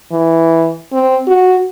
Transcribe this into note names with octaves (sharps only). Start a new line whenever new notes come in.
E3
C4
F#4